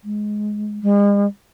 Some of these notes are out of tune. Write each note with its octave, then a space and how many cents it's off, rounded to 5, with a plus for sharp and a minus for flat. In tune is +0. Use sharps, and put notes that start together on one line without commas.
G#3 +15
G#3 -45